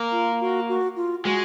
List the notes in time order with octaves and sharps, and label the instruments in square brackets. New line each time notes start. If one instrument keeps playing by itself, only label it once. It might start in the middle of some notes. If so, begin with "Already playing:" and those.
Already playing: [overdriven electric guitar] A#3
[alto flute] F4
F#4
F#4
F4
[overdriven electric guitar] G#3 [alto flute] F#4